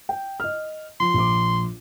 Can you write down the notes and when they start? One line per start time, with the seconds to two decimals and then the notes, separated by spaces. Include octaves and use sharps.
0.09 G5
0.40 D#5 F6
1.00 F3 C6
1.14 A#1 D6